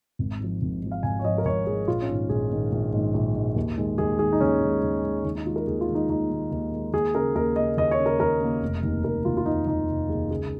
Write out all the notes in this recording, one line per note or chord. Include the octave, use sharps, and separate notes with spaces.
G#1
G#2 F3
G#1
G#2 F3
F5
G#1 G#5
C#5
G#2 F3 D#5
A#4
G#1 C#5
G#2 F3 G#4
A#1 F4
C#4
G#2 D#3
A#1 G#4
G#2 D#3
A#1
G#2 D#3
A#1
G#2 D#3
D#2
D#3 G#3
D#2 G#4
D#3 G#3 G#4
D#4
D#2 C#4
D#3 G#3
D#2
D#3 G#3
D#2 D#4
D#4
D#3 G#3 F4
A#4
D#2 G#4
F4
D#3 G#3
D#4
D#2 D#4
D#3 G#3
D#2
D#3 G#3
D#2 G#4
C#3 A#3 A#4
D#2 A#4
C#3 A#3 D#5
D#2 D#5
C#5
C#3 A#3
A#4
D#2 A#4
C#3 A#3
F1
D#2 D#3
F1 A#4
D#2 D#3 F4
F4
F1 D#4
D#2 D#3 D#4
F1
D#2 D#3 G#4
C#2 G#4